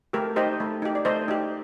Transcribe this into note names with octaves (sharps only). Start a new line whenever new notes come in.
A3 G4 A#4
D#4 G4 C5 D#5
A3
D#4 G4
D5
A3 C5 D#5
D#4 G4